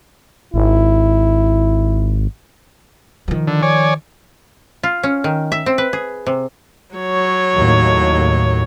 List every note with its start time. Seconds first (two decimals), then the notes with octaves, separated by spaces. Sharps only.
0.54 G#1 E4
3.28 D#3 F3
3.48 D3
3.62 C#5 D5 G#5
4.83 F4
5.03 C#4
5.24 D#3
5.52 E5
5.66 C4
5.78 B4
5.93 G#4
6.26 C3
6.95 F#3 C#5
7.55 D#2 A2